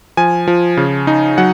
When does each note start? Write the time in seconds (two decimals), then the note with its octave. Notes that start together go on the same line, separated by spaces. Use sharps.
0.17 F3 G#5
0.47 F3
0.77 C#3
1.07 D#4
1.38 F#3 F#5